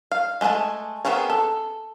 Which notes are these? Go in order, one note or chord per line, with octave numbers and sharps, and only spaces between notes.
F5
G#3 A3 B4 G#5 A5
B3 C4 G#4 A#4 C#5
A4